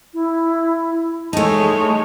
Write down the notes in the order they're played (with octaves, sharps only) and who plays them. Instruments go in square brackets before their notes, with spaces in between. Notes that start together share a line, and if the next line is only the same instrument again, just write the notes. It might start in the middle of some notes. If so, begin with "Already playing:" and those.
[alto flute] E4
[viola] G#3 C#5 [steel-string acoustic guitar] A3 D#4 [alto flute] A5